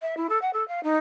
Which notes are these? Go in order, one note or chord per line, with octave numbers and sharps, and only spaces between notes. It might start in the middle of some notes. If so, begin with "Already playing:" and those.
E5
E4
A4
F#5
A4
F5
D#4